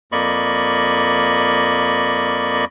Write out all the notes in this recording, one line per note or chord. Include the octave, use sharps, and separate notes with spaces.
F2 A#3 D5 D#5 B5 C#6